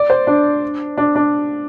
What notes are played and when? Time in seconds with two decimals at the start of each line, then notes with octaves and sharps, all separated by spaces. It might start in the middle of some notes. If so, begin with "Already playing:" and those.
Already playing: D5
0.10 C5
0.27 D4
0.98 D4
1.15 D4